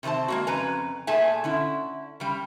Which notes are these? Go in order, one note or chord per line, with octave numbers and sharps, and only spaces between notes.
C3 D#3 C4 C5 A5
G#3 A#3 F#4
F2 C#3 B4 G#5 A#5
A#2 A3 G#4 E5 G#5 A5
D3 C#4 E4
C#3 G3